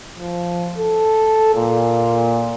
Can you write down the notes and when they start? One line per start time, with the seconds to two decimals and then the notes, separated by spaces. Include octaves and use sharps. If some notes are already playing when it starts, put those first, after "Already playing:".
0.19 F3
0.78 A4
1.55 A#2